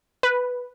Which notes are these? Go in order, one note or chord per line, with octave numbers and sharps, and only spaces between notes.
B4